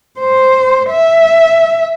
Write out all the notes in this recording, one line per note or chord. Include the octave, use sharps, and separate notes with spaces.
C5
E5